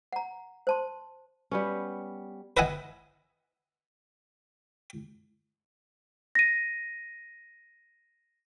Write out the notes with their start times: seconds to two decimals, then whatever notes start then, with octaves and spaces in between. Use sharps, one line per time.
0.13 F#5 A#5
0.67 C5 A5 C6
1.51 G3 B3 C#4
2.57 B4 D#5 E5 F#5 G#5
6.35 A#6 D#7